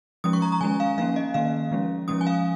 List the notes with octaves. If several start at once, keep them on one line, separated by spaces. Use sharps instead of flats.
F3 G#3 C#4 D#6
C#6
A#5
A#5
D#3 G#3 C#4 G#5
F5
F3 A#3 C#4 F5
D#5
D#3 A#3 C#4 F5
F3 G#3 C#4
F3 G#3 C#4 D#6
G#5
F5